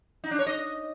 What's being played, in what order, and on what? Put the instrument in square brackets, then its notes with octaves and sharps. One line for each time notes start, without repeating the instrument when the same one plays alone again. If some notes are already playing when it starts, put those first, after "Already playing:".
[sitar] D#4
D4
C#5
D#5